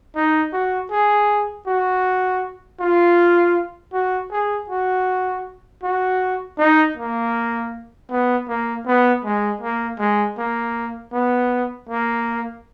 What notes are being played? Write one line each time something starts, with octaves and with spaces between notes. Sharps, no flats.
D#4
F#4
G#4
F#4
F4
F#4
G#4
F#4
F#4
D#4
A#3
B3
A#3
B3
G#3
A#3
G#3
A#3
B3
A#3